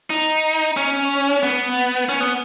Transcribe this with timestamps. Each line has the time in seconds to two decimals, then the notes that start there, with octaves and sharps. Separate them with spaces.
0.10 D#4
0.77 C#4
1.43 B3
2.09 C#4
2.21 B3